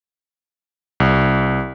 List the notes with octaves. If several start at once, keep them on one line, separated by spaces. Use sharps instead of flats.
C2